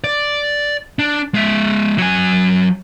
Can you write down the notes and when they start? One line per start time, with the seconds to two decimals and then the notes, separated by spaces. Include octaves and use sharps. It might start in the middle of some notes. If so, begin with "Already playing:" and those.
0.04 D5
0.99 D4
1.34 G#3 E5
1.98 F#3 G#5